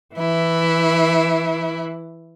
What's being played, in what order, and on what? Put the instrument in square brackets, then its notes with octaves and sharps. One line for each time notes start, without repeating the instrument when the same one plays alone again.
[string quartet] E3 E4